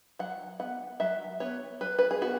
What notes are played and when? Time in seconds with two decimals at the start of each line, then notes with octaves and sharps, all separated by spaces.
0.19 F#3 F#5
0.60 B3 F#5
1.00 F#3 E5
1.40 B3 C#5
1.81 F#3 B4
1.99 B4
2.11 G#4
2.21 B3 F#4